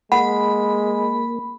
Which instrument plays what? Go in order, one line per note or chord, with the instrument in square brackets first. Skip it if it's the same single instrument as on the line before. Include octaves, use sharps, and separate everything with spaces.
[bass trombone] G#3 [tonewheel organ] A#3 [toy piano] F#5 [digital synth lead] B5